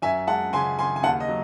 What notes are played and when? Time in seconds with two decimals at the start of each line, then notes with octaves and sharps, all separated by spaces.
0.02 F#2 E5 G#5
0.27 G#3 F#5 A5
0.53 C#3 G#5 C6
0.79 C#3 G#5 C6
0.96 G#5
1.03 D#2 F#5 A5
1.20 D#5
1.28 F#3